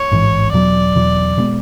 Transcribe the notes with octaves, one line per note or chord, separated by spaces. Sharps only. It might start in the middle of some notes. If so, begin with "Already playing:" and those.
Already playing: C#5
A1 G#2 E3
E2 B2 F#3 D5
E2 B2 F#3
B2 G#3 B3